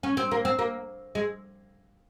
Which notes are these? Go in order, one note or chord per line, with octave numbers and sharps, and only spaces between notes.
C#4
C4
A#3
C4
A#3
G#3